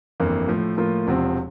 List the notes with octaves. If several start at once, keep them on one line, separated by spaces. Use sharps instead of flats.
G1 F2 E3 A#3
A2 F3 A3
A2 F3 A#3 F4
E1 E2 C3 F3 C4